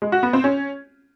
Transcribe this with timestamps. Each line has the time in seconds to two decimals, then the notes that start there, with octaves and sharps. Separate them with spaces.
0.02 G#3
0.12 F#4
0.23 B3
0.33 C4
0.44 C#4